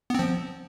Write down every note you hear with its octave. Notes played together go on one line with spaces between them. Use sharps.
F3 B3 C4